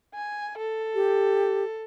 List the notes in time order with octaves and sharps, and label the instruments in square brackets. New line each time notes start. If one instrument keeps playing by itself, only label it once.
[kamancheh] G#5
A4
[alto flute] G4